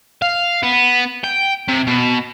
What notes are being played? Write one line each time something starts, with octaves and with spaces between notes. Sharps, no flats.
F5
B3
G5
C3
B2